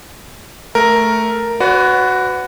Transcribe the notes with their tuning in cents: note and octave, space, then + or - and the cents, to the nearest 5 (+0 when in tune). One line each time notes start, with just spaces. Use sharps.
A3 +0 A#4 +0
F#4 +0 B4 +25 D5 -45